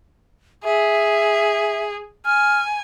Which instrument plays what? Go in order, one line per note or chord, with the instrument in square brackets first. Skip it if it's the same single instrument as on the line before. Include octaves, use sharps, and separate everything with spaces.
[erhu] G#4 [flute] E5
[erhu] G#5 [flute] F6